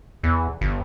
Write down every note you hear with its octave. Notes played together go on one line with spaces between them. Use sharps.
E2
G1